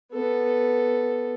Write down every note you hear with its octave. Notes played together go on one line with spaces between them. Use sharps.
B3 A4